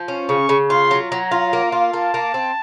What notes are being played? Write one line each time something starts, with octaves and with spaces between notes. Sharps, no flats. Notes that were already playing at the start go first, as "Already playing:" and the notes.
Already playing: F3
C#4
C#3 C#6
C#3
F4 C6
F#3
F#3 A#5
F4
A#3
F4
A#3 A5
A#3
C4